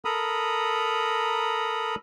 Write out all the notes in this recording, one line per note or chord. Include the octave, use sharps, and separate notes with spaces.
A4 A#4 A#5 B5 D#6